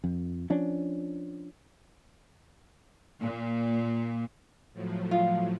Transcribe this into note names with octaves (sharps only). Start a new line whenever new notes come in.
F2
F3 C#4 D4
A#2
A2 F3 F#3
F4